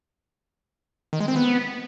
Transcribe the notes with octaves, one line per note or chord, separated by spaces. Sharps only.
D#3
G#3
C4
B3